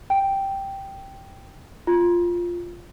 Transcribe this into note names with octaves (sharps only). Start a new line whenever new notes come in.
G5
F4